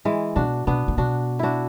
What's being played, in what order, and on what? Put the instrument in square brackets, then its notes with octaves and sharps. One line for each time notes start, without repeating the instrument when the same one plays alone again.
[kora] E3 G#3
[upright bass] B2 [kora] D4 F#4
[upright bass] B2 [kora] B3 D4
[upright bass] A2
[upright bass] B2 [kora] D4 F#4
[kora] D4 E4 F#4